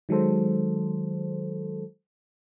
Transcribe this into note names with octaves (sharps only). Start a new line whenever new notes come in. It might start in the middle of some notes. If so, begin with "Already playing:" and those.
D#3 F#3 G#3 A4 C5